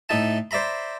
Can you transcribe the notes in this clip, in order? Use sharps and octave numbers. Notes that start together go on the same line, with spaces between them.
A2 D#4 E5 A5
C5 D5 E5 A#5 B5